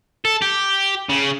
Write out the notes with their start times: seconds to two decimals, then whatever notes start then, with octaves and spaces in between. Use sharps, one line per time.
0.25 A4
0.42 G4
1.10 C#3